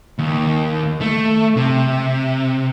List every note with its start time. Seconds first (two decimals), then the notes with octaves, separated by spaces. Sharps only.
0.19 D#2
1.01 A3
1.57 C3